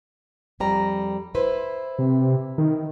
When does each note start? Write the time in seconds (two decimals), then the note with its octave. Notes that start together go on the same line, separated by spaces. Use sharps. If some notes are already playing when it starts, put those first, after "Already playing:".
0.60 F2 G3 A#5
1.35 E4 B4 C5
1.99 C3
2.58 D#3